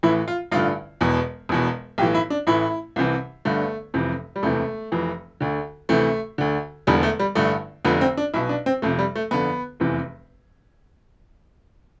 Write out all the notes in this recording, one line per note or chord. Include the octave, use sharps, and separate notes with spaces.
A1 A2 E3 E4
F4
A1 G2 D3 F4
E1 E2 B2
E1 E2 B2
B1 A2 E3 G4
E4
D4
A1 A2 E3 E4
C2 C3 E3
G1 G2 D3 A3
F1 F2 C3 E3
G3
E1 D2 C3 E3 A3
F1 F2 E3
D2 D3
D2 C3 E3 A3
D2 D3
E1 E2 D3 G3
A3
G3
A1 G2 D3 A3
F1 F2 D3 B3
C4
D4
B1 B2 E4
D4
C4
F1 F2 C3 A3
G3
A3
G1 F2 D3 B3
F1 E2 C3 E3